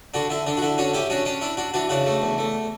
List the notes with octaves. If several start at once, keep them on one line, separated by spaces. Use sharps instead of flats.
D3 D4 F#4
D3 E4
D3 D4
F#4
D3 E4
C#4 D4 F#4
C#4 E4 G4
C#4 D4 F#4
C#4 D4
D4 E4
D4 F#4
E3 D4 F#4
C#3 D4 F#4
A3
E2
A3